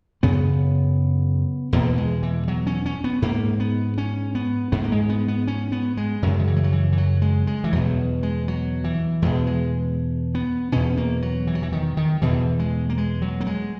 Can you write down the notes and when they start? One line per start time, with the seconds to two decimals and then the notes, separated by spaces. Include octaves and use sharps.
0.23 F#2 C#3 B3
1.73 E2 B2 A#3
1.98 G#3
2.23 E3
2.48 F#3
2.67 C#4
2.86 C#4
3.04 B3
3.22 G#2 A#3
3.60 B3
3.98 C#4
4.35 B3
4.72 G#2 B3
4.84 A#3
4.92 G#3
5.09 B3
5.28 B3
5.47 C#4
5.72 B3
5.97 G#3
6.22 F#2 C#3 F#3
6.39 D#3
6.47 E3
6.56 G#3
6.64 F#3
6.72 E3
6.92 E3
6.97 F#3
7.22 G#3
7.47 G#3
7.64 E3
7.73 E2 B2 F#3
8.23 G#3
8.48 F#3
8.84 E3
9.22 E2 B2 G#3
9.47 G#3
10.35 B3
10.72 E2 B2 C#4
10.97 A#3
11.22 F#3
11.47 E3
11.55 F#3
11.63 E3
11.72 D#3
11.97 D#3
12.22 E2 B2 E3
12.59 G#3
12.90 A#3
12.98 G#3
13.22 F#3
13.41 A#3
13.47 G#3